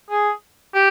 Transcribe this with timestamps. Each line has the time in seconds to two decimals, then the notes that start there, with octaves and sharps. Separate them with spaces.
0.10 G#4
0.74 G4